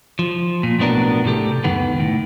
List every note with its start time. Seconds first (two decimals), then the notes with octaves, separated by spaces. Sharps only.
0.19 F3
0.63 A#2
0.79 B1 A2 F#3 B3 D4 A#4
1.25 A2 C3 G4 A4
1.64 C#2 F#2 D#3 B3
2.00 A2